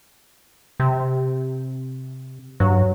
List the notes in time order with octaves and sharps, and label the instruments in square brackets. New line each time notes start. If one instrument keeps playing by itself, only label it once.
[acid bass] C3
[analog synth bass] G2 [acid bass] F#3